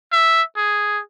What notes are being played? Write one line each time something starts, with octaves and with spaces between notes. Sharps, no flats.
E5
G#4